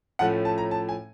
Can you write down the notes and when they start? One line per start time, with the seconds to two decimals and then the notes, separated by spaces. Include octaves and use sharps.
0.19 A2 F3 A3 C#4 F#5
0.45 A5
0.58 A#5
0.71 A5
0.89 G#5